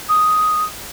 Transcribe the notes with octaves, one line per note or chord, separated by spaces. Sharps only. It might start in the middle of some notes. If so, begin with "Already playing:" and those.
D#6